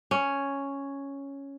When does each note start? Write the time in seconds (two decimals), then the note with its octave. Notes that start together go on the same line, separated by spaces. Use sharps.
0.11 C#4